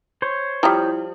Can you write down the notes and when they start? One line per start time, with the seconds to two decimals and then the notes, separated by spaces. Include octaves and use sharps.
0.22 C5 C#5
0.63 F3 G3 E4 G5 A#5 D#6